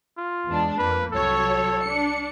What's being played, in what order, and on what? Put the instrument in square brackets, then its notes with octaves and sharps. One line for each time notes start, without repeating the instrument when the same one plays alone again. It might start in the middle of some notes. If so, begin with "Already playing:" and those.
[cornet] F4
[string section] E2 G#3 D4
[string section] F2 A#3 [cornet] B4
[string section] C2 F#3 C#5 [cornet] A4
[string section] D4 C#7